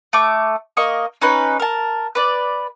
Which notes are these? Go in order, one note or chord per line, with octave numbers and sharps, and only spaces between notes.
A3 D6
A#3 D#5 C#6
C#4 D#4 B4
A#4 A5
B4 D5